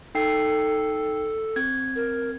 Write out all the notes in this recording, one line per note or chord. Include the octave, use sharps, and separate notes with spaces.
D#4 A4 G5 C7
C4 G#6
A#4